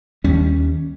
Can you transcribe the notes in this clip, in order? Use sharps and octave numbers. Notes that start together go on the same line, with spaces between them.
D#2 G3 C#4